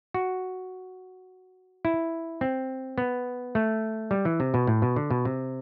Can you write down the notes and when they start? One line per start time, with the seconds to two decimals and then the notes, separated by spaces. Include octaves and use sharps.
0.14 F#4
1.85 E4
2.41 C4
2.98 B3
3.55 A3
4.11 G3
4.25 E3
4.40 C3
4.54 B2
4.67 A2
4.82 B2
4.96 D3
5.11 B2
5.25 C3